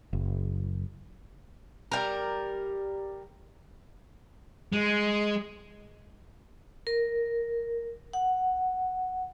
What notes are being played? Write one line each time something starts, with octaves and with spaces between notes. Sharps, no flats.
F#1
G3 A#4
G#3
A#4
F#5